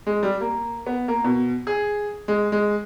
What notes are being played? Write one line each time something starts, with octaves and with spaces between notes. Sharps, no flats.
G#3
G3
A#3
B3
A#3
B2
G#4
G#3
G#3